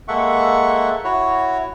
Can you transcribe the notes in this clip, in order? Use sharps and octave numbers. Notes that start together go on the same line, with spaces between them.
G#3 A#3 A4 E5 F#5 C#6
E4 F#4 C#5